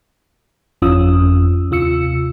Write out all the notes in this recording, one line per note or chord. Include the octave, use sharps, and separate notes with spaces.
G1 F2 C#4 F4 D#6 E6
D#2 C3 F4 E6 C#7